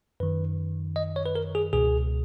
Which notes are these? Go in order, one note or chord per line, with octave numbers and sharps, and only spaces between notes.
F#2 D#3 B4
D#5
C#5
B4
A#4
G#4
C#2 B2 G#4